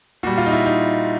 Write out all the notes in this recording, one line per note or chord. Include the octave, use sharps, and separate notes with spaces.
A#2 G3 F#4
F4
D#4
E4
D#4